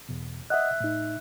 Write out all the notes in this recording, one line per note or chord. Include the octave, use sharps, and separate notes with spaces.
E2 B2
D#5 E5 F#5 D#6 F#6
A2 D#4